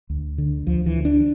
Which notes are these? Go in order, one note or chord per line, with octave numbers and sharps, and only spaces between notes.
D2
D3
D2 F3
E3
D3
D4